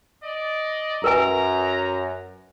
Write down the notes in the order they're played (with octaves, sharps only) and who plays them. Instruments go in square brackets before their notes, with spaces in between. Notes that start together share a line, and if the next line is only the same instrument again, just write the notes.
[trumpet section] D5 D#5
[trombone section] F#2 [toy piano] A#4 B4 G#5 [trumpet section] A#5